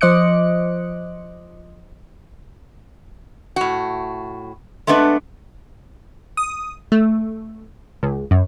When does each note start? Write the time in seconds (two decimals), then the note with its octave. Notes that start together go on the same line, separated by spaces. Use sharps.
0.01 F3 C5 D#5 D6 F#6 C#7
3.56 A2 F#4
4.87 G#3 A3 B3 D4 B4
6.37 D#6
6.92 A3
8.03 C#2
8.31 F#2